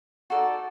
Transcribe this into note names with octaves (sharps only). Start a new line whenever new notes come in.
D#4 F#4 A4 D5